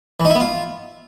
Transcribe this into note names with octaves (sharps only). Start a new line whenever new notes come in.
E3
D#4
E4
B3
F4